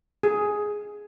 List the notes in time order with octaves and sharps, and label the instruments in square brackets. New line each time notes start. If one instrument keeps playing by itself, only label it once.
[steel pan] G#4